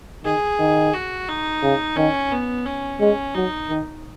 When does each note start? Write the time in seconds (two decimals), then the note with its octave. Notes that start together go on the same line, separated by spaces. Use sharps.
0.24 D#3 G#4
0.59 D#3
0.93 F#4
1.28 D#4
1.63 C#3
1.96 D#3 C#4
2.32 B3
2.65 C#4
3.00 G#3 C#4
3.34 F#3 D#4
3.69 D#3